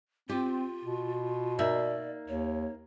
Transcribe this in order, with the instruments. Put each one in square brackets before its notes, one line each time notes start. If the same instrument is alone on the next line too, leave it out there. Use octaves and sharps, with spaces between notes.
[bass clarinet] C4 [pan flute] F4 [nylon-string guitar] G4
[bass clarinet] B2
[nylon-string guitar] A#3 D#4 E5 [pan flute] D5
[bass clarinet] D#2 [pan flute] C#5